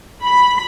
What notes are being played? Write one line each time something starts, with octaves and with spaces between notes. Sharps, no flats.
B5